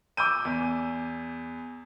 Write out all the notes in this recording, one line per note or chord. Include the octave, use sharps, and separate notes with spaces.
D6 E6 G6 D#7
E2